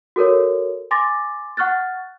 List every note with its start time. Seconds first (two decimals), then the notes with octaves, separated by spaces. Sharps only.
0.16 F#4 A4 A#4 C#5
0.91 G#5 C6 D6 A6 A#6
1.57 F#5 C#6 F6 F#6 A6